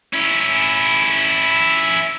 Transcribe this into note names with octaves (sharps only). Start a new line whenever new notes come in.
C#4 E4